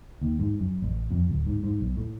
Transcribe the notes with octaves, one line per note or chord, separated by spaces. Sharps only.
D#2
G#2
F#2
A1
F2
D1
G#2
G#2
B1
A2